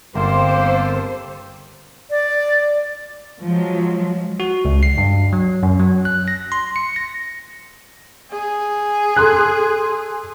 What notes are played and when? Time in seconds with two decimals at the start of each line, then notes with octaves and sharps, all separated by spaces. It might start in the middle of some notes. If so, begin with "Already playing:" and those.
0.15 G1 A#3 C4 G4 A4 C5
2.10 D5
3.43 F3 F#3 G#3
4.40 F#4
4.65 C#2
4.83 C7
4.98 G2
5.33 F#3
5.63 F#2
5.80 F#3
6.05 F#6
6.28 A#6
6.52 C6
6.76 C#7
6.96 A#6
8.31 G#4
9.16 A4 C6 F#6